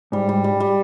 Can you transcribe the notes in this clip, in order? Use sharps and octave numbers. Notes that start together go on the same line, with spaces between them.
G#2 G3
G3
G3
G3